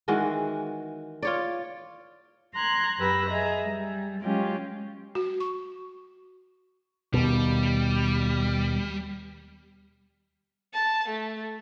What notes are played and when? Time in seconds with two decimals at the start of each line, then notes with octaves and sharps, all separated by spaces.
0.08 D#3 E3 G#3 F#4
1.22 F4 C#5 D5
2.54 A#5 C6 F#6 G#6
2.98 F#2 G4 B4 B5 E6 A#6
3.28 G#4 D#5 E5 A#5
3.63 G3
4.22 F#3 G#3 C#4 F4 G4
5.15 F#4
5.40 C#6
7.14 D#2 B2 G3
10.74 A5
11.08 A3